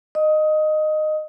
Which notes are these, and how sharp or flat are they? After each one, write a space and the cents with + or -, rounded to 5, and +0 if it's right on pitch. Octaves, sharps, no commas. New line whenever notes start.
D#5 -15 D#6 +20